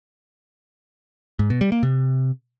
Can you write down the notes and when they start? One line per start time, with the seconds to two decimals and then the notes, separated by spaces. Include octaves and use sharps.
1.39 G#2
1.50 B2
1.61 G3
1.72 A#3
1.83 C3